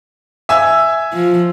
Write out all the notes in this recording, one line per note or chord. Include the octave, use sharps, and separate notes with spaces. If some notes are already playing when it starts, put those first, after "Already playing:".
E5 G#5 E6
F3